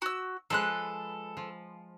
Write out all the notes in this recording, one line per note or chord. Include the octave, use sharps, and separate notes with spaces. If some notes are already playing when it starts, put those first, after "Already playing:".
F#4 E6
F3 G#3 A4 B4 F#6
F3